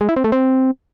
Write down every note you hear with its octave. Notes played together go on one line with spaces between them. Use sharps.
G#3
E4
C4
A3
C4